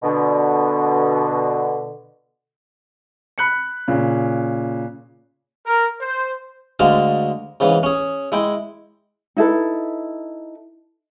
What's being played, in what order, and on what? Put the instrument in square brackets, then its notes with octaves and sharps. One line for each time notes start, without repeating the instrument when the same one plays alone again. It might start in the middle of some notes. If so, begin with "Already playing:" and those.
[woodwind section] B2 D3
[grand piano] B5 F#6 C#7
A#2 C#3
[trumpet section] A#4
C5
[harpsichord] D2 D3 G#3 F5 A5
G#2 C#3 E3
C#4 G#4
G#3 E4 G5
[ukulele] D#4 E4 A4 B4